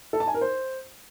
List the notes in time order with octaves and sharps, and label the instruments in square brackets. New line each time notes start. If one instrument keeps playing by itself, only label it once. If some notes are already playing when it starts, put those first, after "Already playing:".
[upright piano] A4
A5
G#5
A#4
C5